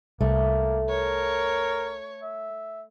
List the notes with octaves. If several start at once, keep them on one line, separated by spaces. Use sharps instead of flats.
C2 A3 A#3
A#4 C#5
E5